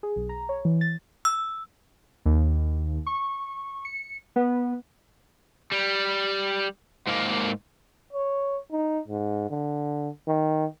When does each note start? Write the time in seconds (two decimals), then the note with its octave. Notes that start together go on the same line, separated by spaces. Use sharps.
0.03 G#4
0.16 B1
0.29 A#5
0.49 C#5
0.65 E3
0.81 A6
1.25 E6
2.25 D#2
3.07 C#6
3.85 C#7
4.36 B3
5.72 G3
7.07 G#2 A#3
8.13 C#5
8.72 D#4
9.08 G#2
9.50 D3
10.28 D#3